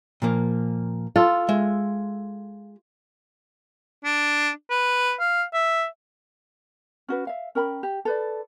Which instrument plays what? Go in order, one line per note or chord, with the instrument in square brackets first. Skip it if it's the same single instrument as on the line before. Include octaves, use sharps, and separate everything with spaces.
[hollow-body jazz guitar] A#2 F3 A#3
[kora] F4 A4
[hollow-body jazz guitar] G#3 E5
[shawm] D4
B4
F5
E5
[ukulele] C#4 F#4 B4
E5 F5
C#4 A#4 G5 B5
G4
A4 B4 D5